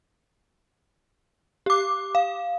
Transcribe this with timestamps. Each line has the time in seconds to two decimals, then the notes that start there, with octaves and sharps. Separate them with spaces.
1.66 G4 D6
2.15 F5